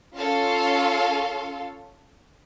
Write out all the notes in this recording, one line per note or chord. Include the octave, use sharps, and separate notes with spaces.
C#4 F4 A4 F5 C6